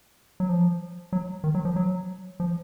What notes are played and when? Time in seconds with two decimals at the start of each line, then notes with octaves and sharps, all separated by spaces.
0.40 F#3
0.49 F3
1.13 F#3
1.44 D#3
1.55 F#3
1.65 F3
1.76 F#3
2.40 F3